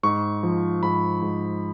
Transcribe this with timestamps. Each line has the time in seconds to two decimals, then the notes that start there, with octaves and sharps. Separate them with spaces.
0.03 G#2 C#6
0.43 F3
0.83 G#2 B5
1.22 G#2